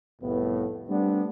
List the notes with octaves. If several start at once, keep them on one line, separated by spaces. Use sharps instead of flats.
C2 F2 A2 B3
G3 A3 B3 C4 D4